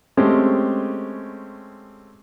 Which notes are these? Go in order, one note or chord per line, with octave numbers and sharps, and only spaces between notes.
G#3 A3 C4 C#4 G4